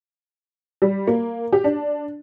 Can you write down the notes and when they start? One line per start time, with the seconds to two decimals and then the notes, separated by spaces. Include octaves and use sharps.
0.82 G3
1.07 A#3
1.53 G4
1.64 D4